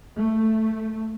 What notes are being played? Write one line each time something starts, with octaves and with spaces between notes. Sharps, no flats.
A3